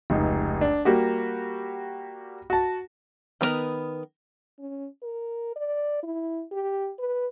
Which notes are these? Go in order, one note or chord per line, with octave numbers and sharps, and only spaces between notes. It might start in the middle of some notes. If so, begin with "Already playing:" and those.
F1 C#2 D#4
D4
G3 A#3 F#4 G4
F#4 A5
D#3 B3 C#4 A#4 B4
C#4
A#4
D5
E4
G4
B4